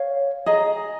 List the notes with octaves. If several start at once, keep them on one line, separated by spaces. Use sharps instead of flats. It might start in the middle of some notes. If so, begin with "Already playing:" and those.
Already playing: C#5 F5
G#4 D#5 A#5